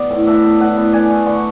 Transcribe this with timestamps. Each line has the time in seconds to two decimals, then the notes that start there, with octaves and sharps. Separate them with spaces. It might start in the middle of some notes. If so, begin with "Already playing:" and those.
Already playing: B3 D5
0.10 A2
0.27 D4 E5
0.44 B3
0.60 A2 F#5
0.77 B3
0.93 D4 G#5
1.10 A3
1.26 D3 C#6